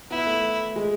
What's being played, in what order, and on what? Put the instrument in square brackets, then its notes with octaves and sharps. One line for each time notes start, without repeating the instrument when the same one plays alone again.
[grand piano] B3 [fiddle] E4
[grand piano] A3
G#3